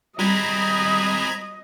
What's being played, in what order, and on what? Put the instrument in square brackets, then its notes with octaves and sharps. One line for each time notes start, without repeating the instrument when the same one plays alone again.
[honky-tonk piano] G3 [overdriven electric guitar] G#3 C4 [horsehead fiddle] D#5 [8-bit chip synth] A#5 B5 G#6